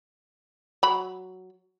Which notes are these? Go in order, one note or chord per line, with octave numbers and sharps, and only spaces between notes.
F#3 B5